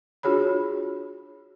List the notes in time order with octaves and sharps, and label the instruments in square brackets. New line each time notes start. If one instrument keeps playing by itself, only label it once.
[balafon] D4 F4 F#4 G#4 C#5 B5